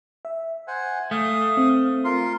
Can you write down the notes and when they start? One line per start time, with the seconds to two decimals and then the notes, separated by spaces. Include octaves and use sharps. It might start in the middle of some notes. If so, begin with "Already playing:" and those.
0.25 E5
0.68 C5 F#5 G#5
1.11 A3 F5 D#6
1.57 C4
2.05 F4 A#4 C6